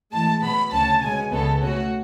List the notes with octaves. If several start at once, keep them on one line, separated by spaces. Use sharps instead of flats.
A2 E3 G#3 A5
B2 F#3 B3 B5
D2 C#3 F#3 C#4 A5
B2 G#3 C#4 G#5
C#2 C#3 G#3 B3 A4
B2 A3 C#4 F#4